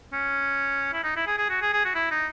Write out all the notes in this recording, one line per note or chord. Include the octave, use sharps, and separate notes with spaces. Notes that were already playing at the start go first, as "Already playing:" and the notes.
C#4
E4
D#4
E4
G#4
G#4
F#4
G#4
G#4
F#4
E4
D#4